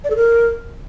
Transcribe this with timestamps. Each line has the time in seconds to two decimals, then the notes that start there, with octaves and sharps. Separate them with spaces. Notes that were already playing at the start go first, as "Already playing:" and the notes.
0.04 D5
0.10 A4
0.16 A#4